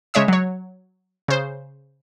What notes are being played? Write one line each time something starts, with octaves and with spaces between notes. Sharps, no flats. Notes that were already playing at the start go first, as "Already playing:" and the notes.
C#3 G#3 C#5 E5 D#6
F#3 C#5
C#3 C5